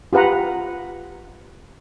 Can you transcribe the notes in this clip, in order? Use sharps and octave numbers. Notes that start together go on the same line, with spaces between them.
F4 G4 B4 F#5 A#5